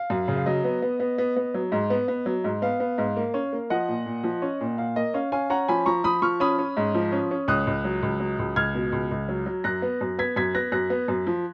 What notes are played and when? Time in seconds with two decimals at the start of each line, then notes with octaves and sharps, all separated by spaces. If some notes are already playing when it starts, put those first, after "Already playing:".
Already playing: F5
0.10 F#2
0.28 C#3
0.36 F5
0.46 F#3 D#5
0.64 B3
0.82 B3
1.00 B3
1.18 B3
1.36 B3
1.54 F#3
1.72 G#2
1.90 B3
2.08 B3
2.26 F#3
2.44 G#2
2.62 B3 F5
2.80 B3
2.98 G#2
3.17 A#3
3.34 C#4
3.53 A#3
3.70 F3 D#5 F#5
3.88 A#2
4.06 A#2
4.24 F3
4.42 C#4
4.61 A#2
4.78 A#2 F5
4.96 A#3 D#5
5.14 C#4 F5
5.32 C#4 F5 G#5
5.50 C#4 F#5 A#5
5.68 F3 G#5 B5
5.86 F3 A#5 C#6
6.04 F3 B5 D#6
6.22 F3 C#6 F6
6.40 C#4 B5 D#6
6.58 C#4
6.77 G#2
6.94 F3
7.12 C#4
7.31 C#4
7.48 C#2 D#6 F#6
7.67 C#2
7.85 F#3
8.03 C#2
8.20 F#3
8.39 C#2
8.56 C#2 F6 G#6
8.75 B2
8.92 C#2
9.11 C#2
9.29 F#3
9.46 F#3
9.64 F#2 F#6 A#6
9.82 B3
10.01 F#2
10.18 B3 G#6 B6
10.36 F#2 G#6 B6
10.55 B3 F#6 A#6
10.72 F#2 F#6 A#6
10.90 B3
11.08 F#2
11.27 F3